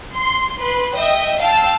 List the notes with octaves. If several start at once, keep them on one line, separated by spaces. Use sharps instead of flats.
C6
B4 C6
D#5 E5 G5
F5 G5 A5 E6